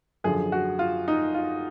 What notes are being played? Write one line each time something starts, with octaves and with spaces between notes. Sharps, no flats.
F#2 D3 F3 G#4
F#4
F4
D#4
F4